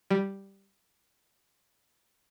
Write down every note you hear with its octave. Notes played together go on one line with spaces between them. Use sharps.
G3